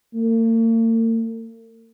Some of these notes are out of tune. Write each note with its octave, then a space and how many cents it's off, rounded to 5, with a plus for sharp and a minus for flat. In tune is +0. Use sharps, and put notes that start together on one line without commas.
A#3 -45